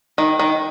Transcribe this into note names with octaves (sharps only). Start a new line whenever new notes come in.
D#3
D#3